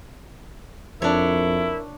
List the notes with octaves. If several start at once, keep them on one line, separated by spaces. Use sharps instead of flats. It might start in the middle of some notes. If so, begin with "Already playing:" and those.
F2 D4 E4 A#4 C#5